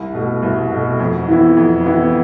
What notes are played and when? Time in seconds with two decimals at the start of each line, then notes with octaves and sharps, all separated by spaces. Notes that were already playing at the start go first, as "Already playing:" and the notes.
Already playing: C2
0.14 B2 A3
0.42 C2
0.71 B2 A3
1.00 F2
1.28 E3 B3 E4
1.57 F2
1.86 E3 B3 E4